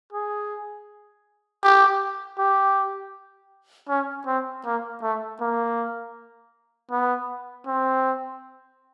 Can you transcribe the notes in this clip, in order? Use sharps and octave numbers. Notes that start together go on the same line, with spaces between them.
G#4
G4
G4
C#4
C4
A#3
A3
A#3
B3
C4